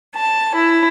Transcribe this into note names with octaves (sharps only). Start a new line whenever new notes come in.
A5
E4